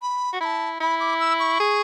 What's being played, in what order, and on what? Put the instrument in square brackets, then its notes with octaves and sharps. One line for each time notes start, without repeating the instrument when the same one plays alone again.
[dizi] B5
[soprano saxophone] F#4
[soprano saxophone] E4 [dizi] B5
[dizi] A5
[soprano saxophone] E4 [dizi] B5
[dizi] D6
E6
C#6
[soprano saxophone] G#4